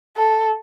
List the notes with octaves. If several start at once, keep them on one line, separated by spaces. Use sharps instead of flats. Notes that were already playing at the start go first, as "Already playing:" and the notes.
A4